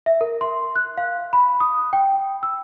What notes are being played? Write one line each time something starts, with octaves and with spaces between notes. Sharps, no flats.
E5
A#4
C6
F#6
F5
B5
D#6
G5
E6